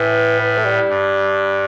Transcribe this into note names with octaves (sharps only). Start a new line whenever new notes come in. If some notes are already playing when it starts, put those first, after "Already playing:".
Already playing: A2 E3
E3
A3
G3
G2